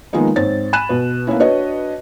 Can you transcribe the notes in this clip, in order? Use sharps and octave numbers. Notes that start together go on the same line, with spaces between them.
D#3 F3 G#3 A#3 B3 D#4
G#2 C4 C#5 A6
G#5 B5 F#6 D#7 E7
B2 B4
A#3 B3 C#4 E4
D4 F#4 B4 C#5 D#5